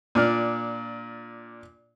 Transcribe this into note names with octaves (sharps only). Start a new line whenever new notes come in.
A#2 D4 D5 F6